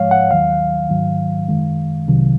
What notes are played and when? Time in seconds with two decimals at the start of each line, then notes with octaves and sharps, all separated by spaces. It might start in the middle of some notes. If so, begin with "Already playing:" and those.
Already playing: G#2 F3 G#3 C#5 F5
0.11 F#5
0.31 D#2 D#3 F#3 F5
0.90 G#2 D#3 F#3
1.49 F#2 D#3 G#3
2.07 C2 C3 D#3 F#3